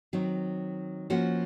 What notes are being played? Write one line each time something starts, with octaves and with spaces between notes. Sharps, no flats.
D#3 F#3 C4 D#4
F3 A#3 C#4 F#4